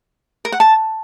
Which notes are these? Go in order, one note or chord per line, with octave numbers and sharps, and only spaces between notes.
A#4
F#5
A5